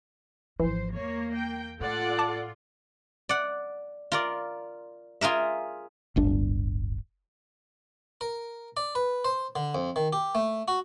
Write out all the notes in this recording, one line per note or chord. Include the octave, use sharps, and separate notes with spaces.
G#1 E3 F3 C5
E2 A#3 C#5
G5
A2 F4 A4 D5 F#5
A5 D6
D5 F#5
F4 A#4 D5
F4 G#4 A#4 E5
D1 G1 D4
A#4
D5
B4
C5
D3
F2
D#3
G4
A3
F#4